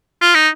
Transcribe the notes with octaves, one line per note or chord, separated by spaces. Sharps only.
F4
D#4